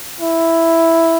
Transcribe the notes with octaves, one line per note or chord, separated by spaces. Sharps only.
E4